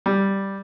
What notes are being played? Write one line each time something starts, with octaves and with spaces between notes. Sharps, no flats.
G3